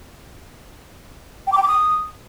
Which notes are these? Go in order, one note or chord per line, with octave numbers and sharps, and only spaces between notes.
G5
D6
G5
D6
D#6